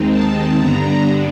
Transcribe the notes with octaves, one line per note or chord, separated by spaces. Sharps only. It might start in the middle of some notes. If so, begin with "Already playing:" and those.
Already playing: D#2 D#3 G#3 C4 D#4
A5
G2 D3 G3 B3 D4 A#5